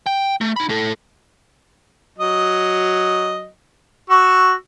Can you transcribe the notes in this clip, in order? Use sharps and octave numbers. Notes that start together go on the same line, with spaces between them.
G5
A3
D#4 B5
A2 A4
F#3 D#5
F#4 C#6 E6